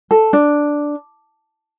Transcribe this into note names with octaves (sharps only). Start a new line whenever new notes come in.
A4
D4